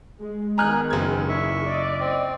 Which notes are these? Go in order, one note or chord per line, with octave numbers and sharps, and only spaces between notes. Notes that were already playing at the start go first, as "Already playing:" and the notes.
G#3
D#3 B3 D#4 G#4 G#5 A#5 F6 F#6
F#1 C4 G#6
D4 E4 E5 C#6
D5 D#5
C4